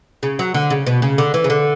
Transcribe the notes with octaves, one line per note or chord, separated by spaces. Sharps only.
C#3
F#3
D3
C#3
B2
C#3
D3
E3
C#3
D3